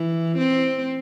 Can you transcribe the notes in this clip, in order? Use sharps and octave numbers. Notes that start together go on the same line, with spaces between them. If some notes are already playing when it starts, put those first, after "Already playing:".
Already playing: E3
C4